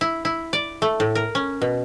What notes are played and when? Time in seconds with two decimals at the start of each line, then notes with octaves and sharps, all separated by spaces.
0.01 E4
0.25 E4
0.53 D5
0.82 A3
1.00 A2
1.15 A#4
1.35 C#4
1.62 B2